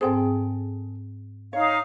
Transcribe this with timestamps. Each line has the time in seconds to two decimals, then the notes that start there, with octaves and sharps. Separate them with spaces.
0.01 G#2 C4 G#4 A4 C5 G5
1.53 D#4 C#5 F5